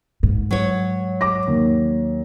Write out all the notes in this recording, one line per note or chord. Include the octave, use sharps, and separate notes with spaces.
G#2
F#3 C#5
D6 A#6
D#2